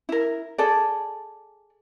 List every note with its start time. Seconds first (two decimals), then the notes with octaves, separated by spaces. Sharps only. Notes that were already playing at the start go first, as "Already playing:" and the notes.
0.09 E4 A#4
0.58 G#4 A4 D5